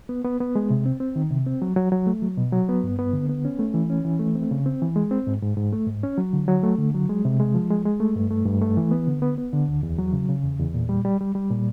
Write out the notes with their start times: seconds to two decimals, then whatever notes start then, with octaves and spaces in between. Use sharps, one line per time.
0.09 B3
0.25 B3
0.40 B3
0.55 G#3
0.70 C3
0.86 C4
1.00 C4
1.16 D#3
1.31 C3
1.47 C4
1.62 F#3
1.76 F#3
1.92 F#3
2.07 A3
2.22 F#3
2.37 B2
2.52 F#3
2.69 B3
2.83 G2
2.99 B3
3.13 D3
3.29 B3
3.45 C#4
3.59 A3
3.74 E3
3.90 C#4
4.05 E3
4.20 A3
4.35 C4
4.51 C#3
4.66 C4
4.82 E3
4.96 G#3
5.11 C4
5.27 G#2
5.42 G#2
5.57 G#2
5.73 A3
5.87 G#2
6.03 C#4
6.18 F#3
6.33 D3
6.48 F#3
6.63 A3
6.78 D3
6.94 F#3
7.09 G#3
7.25 C3
7.40 G#3
7.55 F3
7.70 G#3
7.85 G#3
8.00 A3
8.16 G2
8.30 A3
8.45 G2
8.62 A3
8.77 E3
8.91 B3
9.08 D3
9.22 B3
9.38 B3
9.53 D3
9.68 D2
9.83 E2
9.98 F#3
10.13 C#3
10.28 C#3
10.44 E2
10.60 E2
10.74 A#2
10.89 G3
11.05 G3
11.20 G3
11.35 G3
11.51 A#2